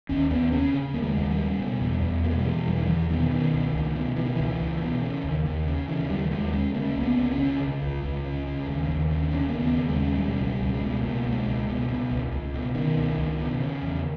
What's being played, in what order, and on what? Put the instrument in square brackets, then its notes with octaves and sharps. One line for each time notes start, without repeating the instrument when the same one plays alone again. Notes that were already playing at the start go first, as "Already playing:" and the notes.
[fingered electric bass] D#2 C#4
D#2 B3
C#3 C#4
C#3
D#2 A#3
G#3
D#2
G3
C#3
B2
E2
E2
B2 A#3
G#3
G3
B2 E3
E2 G3
D#3
E2 E3
B2 D#3
B2 D#3
C#2
C#2
B2
B2 E3
D#3
C#2 E3
C#2
B2
C#3
D#2
D#2
C#3
C#3 E3
D#2 G3
D#2 G#3
C#3 G#3
C#3 A#3
C#2
B3
C#2
C#4
C#3
C#3
C#2
C#2
C#3
C#3
D#2
D#2
C#3
C#3 C#4
D#2 A#3
B3
D#2
G#3
C#3
B2 G3
C#2
G3
C#2
G#3
B2
B2 A#3
C#2
G#3
C#2
B2
B2
C#2
C#2
B2
B2 D#3
C#2
C#2
B2
C#3
E2